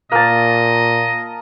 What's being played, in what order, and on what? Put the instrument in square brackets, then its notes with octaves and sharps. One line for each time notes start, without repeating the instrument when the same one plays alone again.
[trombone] A#2 [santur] A#3 A5 [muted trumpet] D#5